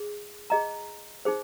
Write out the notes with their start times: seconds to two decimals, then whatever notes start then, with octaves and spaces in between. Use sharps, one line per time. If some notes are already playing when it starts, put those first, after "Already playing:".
Already playing: G#4
0.50 G#4 D#5 A#5
1.25 D#4 G#4 C5